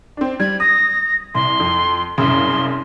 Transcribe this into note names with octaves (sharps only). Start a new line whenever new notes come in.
C4 D4
G3 G#6
D#6 A#6
C2 C6
F2
C2 F#2 C#3 C6